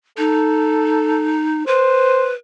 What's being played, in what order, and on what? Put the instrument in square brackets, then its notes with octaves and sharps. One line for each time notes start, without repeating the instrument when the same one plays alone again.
[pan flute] D#4 [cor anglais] A4
[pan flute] B4 [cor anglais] C5